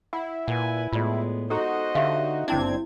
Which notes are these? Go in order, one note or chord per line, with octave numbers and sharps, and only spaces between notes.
E4 F#5
A#2 B4 F#5 G#5
A2 G#3 B3 F4 D5
D#4 F#4 A4 C5 D#5
D3 G4 E5 F5
G1 C4 D4 E4 G#6